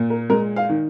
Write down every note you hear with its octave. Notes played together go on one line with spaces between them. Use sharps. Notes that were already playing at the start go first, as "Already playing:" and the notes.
Already playing: A#2
A#4
G#3 A#4
F5
D#3